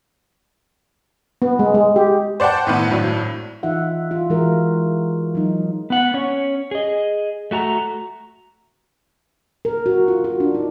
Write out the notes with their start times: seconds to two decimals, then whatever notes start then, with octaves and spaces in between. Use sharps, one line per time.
1.42 B3
1.59 G#3
1.74 G#3
1.96 G4
2.40 C5 D5 F#5 G5 A5
2.67 A2 D#3 B3 B4
2.90 G#1 A2 F#3 D4
3.63 E3 D#4 F4 E5 F#5
4.11 F4
4.30 E3 G#3 E4 F#4 A#4
5.35 F#3 D#4
5.90 B3 F#5
6.14 C#4 C#5
6.71 G#4 D#5
7.51 A3 F#4 A5 A#5
9.65 A#4
9.86 F#4
10.08 F4
10.24 F#4
10.40 D4
10.55 D#4